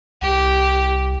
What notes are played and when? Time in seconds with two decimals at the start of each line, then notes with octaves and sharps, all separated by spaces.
0.22 C2 G4